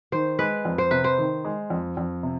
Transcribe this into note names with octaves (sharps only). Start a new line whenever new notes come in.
D#3 C5
G#3 B4
F2
C5
C3 B4
C5
D#3
G#3
F2
F2
C3